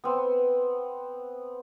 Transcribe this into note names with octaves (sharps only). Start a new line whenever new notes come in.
B3 C4